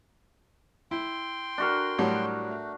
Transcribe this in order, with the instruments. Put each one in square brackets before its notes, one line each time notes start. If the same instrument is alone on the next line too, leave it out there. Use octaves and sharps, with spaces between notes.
[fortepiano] E4 [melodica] G5 C6
[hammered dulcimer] D4 F#4 A#4
[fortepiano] A2 F#3 G3
[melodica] A3